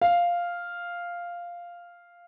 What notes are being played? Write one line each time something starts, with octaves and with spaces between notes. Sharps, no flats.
F5